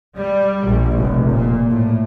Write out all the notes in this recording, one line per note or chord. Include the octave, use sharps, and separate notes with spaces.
G3
A#1
F1
A#2
A2